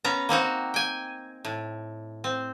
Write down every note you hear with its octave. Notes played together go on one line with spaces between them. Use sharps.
B3 C#4 A#5
A#3 C4 D#4 F#4
G5 G#5
A2
C4